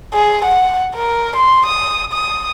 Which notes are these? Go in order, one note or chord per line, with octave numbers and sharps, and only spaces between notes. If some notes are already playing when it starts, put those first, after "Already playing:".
G#4
F#5
A#4
C6
D#6
D#6